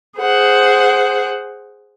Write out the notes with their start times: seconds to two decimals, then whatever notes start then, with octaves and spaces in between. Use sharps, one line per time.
0.19 G#4 C5 F#5